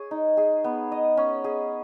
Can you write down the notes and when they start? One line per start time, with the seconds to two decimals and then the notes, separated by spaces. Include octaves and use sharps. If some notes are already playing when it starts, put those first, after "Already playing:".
Already playing: G#4 C#5
0.11 D#4
0.37 G#4
0.64 B3
0.92 D#5
1.17 C#4
1.44 G#4